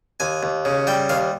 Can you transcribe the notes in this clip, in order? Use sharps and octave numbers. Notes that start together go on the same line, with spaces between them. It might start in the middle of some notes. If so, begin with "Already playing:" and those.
D#2 G#5
D#2
C#3
G3 G5
D#2 F5